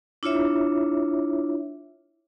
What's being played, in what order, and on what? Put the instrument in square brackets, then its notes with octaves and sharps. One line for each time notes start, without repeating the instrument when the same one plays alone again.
[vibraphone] D4 E4 F4 C#5 E5